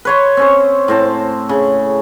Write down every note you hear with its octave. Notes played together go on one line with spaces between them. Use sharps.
B4 C#5 C6
C4 C#4 C5
A2 C4 A5
C#3